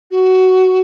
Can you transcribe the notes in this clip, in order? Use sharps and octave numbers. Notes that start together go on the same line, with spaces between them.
F#4